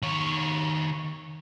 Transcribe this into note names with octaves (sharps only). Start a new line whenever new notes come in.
D#3 C#5